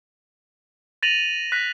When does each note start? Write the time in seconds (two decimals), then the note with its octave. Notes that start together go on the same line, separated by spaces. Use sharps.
1.03 A6 A#6 D#7 F7 F#7
1.52 F#6 A#6 B6